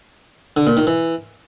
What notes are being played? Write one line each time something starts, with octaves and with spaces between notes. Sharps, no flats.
D3
A#2
D#3
E3